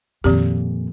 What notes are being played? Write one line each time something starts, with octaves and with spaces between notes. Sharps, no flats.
F2 A#2 D#3 C4 G4